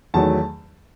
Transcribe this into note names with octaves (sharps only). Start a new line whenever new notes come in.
E2 D#3 F#3 A3 A5